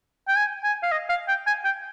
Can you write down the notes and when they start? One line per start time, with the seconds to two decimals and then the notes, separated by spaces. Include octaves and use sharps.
0.28 G5
0.36 G#5
0.64 G#5
0.83 F5
0.92 D#5
1.09 F5
1.28 G5
1.47 G#5
1.65 G5